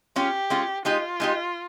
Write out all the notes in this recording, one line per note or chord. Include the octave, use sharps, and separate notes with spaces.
G#3 C#4 F4 G4
G#3 C#4 F4
G#3 D#4 F4 G4
G#3 D#4 G4